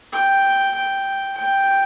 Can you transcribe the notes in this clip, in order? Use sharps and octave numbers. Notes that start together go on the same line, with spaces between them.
G5
G5
G5